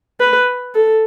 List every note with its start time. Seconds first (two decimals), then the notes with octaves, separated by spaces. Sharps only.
0.20 B4
0.75 A4